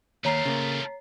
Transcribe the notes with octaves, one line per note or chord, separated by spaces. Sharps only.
D#2 A3 F4 C#5 A#5 C7
C#3 A#3